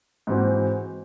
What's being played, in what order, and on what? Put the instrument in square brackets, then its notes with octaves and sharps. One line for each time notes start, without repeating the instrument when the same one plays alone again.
[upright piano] G#2 E3 C4 F#4